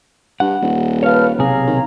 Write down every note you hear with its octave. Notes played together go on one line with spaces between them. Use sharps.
G2 F#5
D#1
B4 C#5 F5 A5 F6
B1 C3 G#4 C#5 F5 A#5
D#3